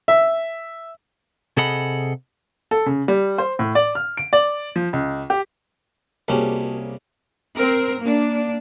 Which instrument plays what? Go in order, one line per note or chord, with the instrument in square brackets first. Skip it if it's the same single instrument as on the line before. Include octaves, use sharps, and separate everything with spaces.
[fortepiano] E5
[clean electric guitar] C3 G#4 A4 D#5 F#5 B5
[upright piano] A4
C#3
G3
C5
A2
D5
F6
D7
D5
F3
C#2
G4
[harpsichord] C2 G3 C#4 [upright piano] A#3 G#4 [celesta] F#4 C#5 A5
[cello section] C4 A#4
A#3 D4